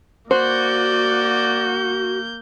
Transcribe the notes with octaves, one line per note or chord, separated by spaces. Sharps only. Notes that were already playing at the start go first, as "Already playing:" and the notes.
A#3 F#4 C5 D5 G6